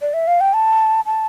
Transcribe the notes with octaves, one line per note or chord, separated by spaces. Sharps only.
D5
E5
F5
G5
A5
A5